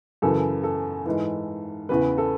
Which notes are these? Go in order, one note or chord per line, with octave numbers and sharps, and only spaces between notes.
F#2 C#3 E3 A4
A4
G#2 E3
E2 C#3 E3 B4
A4